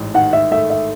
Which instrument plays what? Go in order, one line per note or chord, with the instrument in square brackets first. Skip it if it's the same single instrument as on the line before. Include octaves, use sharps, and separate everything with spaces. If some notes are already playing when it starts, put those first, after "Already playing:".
Already playing: [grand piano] A1 G#2
[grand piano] D#3 [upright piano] F#5
[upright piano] E5
[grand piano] A3 [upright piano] E5
[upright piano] E5